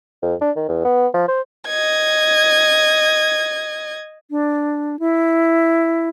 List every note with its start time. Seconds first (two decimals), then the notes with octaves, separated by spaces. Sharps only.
0.22 F2
0.41 D4
0.56 D#3
0.68 E2
0.84 B3
1.14 F3
1.28 C5
1.67 D#5 G#6
4.31 D4
4.99 E4